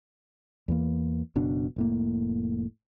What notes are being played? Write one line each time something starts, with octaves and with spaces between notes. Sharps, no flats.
E2 E3 A#3
F#1 B2 D4
F1 A2 A#3